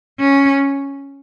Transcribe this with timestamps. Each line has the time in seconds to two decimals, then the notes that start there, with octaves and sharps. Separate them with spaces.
0.18 C#4